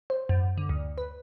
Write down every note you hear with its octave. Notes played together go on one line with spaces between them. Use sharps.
C5
F#2
D3
D2
B4